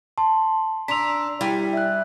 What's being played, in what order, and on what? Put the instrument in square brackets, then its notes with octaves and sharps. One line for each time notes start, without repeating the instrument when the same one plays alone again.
[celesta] A5 [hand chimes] C6
[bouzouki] D4 [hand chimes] A#5 C6 E6 [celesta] B6 F7
[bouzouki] G3 G#5 [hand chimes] E4
[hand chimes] E5 F#6